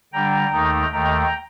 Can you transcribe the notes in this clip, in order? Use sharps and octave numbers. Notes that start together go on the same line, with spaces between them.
D3 G3 D4 G5 A#5
D#2 D#3 A3 D#4
D#2 D#3 A3 G5 A#5